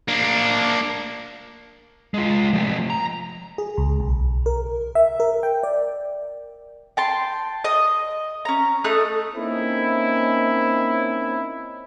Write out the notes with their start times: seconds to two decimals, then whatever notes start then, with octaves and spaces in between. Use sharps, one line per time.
0.08 A#3 D4
2.14 G#3 F4
2.53 F3 A3
2.90 A#5
3.58 G#4
3.78 C#2
4.00 B1
4.46 A#4
4.95 E5
5.20 A#4
5.43 G5
5.63 D5
6.97 G5 A5 C6
7.64 D#5
8.45 C#4 A#5
8.84 A3 D#4 D#6 F#6
9.35 A#3 C4 C#4 D#4 E4